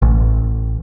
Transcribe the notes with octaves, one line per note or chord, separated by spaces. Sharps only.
A1